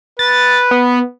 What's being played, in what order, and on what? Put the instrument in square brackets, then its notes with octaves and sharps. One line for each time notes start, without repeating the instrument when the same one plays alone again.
[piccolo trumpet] B4 [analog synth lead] A6
[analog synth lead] B3